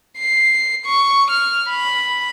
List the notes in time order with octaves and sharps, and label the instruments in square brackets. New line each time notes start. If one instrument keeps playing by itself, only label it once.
[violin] C7
C#6
F6
B5